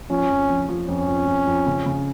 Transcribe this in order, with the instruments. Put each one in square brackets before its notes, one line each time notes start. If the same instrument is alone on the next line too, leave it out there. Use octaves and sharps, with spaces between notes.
[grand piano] F3 [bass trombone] C#4
[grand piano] F2
F3
F3
[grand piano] F2 [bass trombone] C#4
[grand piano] F2
F2
F2
C#3
C#3